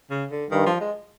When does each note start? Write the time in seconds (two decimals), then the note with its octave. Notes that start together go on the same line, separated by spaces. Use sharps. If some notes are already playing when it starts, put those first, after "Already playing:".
0.11 C#3
0.31 D3
0.51 G2 D#3
0.66 F3
0.81 G#3